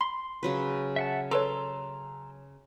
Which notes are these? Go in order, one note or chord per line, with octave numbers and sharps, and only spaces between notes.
B5 C6
C#3 F#3 B4
E5 F#5 A5
A4 B4 C#5 A5 A#5 C6 E6